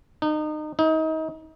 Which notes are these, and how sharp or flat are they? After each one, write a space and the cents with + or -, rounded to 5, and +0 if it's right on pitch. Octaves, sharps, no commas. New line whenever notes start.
D#4 -30
D#4 +30